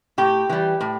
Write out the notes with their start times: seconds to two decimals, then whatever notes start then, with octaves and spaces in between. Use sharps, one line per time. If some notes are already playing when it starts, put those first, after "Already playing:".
0.18 A2 G4
0.49 E3 G3
0.81 A2